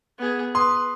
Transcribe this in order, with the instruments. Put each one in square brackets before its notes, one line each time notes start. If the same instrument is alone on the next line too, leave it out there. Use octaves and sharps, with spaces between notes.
[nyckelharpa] B3 G#4
[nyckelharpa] B4 [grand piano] C6 D#6